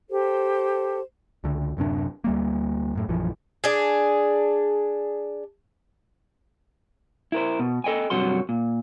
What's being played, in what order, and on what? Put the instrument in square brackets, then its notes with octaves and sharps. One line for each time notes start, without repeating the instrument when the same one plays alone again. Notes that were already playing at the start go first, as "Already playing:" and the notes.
[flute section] G4 A4 C5
[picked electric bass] C#2 D3
D1 F#2 C3 D4
D2 G3 A#3
F#2 A2
A#1 F#2 E3 F3
[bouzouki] D4 G#4
[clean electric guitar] E4 A#4 C5
B2
A4 D#5 G5 G#5
G2 C3 F#3 F#4 C6
A#2